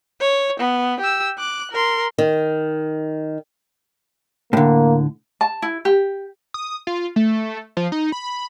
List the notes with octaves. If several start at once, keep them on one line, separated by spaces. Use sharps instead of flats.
C#5
B3
G4 E6
D6 F#6
A#4 C6
D#3
A2 D3 A#3
A5
E4
G4
D#6
F4
A3
F3
D#4
B5